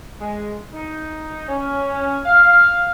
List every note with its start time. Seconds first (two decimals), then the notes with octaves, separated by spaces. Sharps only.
0.20 G#3
0.73 D#4
1.48 C#4
2.25 F5